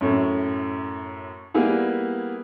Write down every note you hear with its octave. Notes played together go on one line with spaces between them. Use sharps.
F#2 A2
G3 A#3 B3 E4 G#4